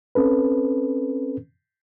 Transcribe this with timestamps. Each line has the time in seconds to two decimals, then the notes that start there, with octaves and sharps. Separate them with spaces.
0.15 C4 C#4 A4 B4